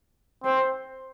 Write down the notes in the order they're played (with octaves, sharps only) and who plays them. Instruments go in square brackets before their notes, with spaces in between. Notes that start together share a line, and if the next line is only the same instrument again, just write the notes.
[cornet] C4 [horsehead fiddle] C5